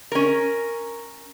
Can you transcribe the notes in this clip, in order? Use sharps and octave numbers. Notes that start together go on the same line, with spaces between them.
C#4 A#4